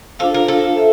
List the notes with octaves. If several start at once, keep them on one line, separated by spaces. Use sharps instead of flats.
D4 F4 A4 C5 F5
A#4
A4
E5